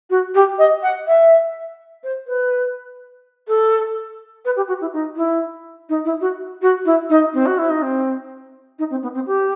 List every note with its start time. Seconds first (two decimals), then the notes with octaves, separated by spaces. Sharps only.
0.10 F#4
0.34 G4
0.58 D#5
0.82 F#5
1.07 E5
2.03 C5
2.27 B4
3.48 A4
4.45 B4
4.56 G4
4.68 F#4
4.81 E4
4.93 D#4
5.16 E4
5.89 D#4
6.05 E4
6.21 F#4
6.62 F#4
6.85 E4
7.09 D#4
7.34 C4
7.46 F#4
7.58 E4
7.70 D#4
7.82 C4
8.78 D#4
8.90 C4
9.02 B3
9.14 C4
9.26 G4